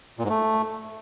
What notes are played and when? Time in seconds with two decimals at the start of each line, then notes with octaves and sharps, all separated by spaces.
0.19 A#2
0.24 G#2
0.29 A3